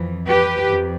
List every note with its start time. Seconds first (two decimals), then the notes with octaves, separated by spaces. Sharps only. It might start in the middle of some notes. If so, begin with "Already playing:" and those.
Already playing: F2 E3
0.27 G4 B4
0.68 F2